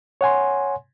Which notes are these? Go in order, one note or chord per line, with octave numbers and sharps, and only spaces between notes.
C#5 F#5 G#5 C6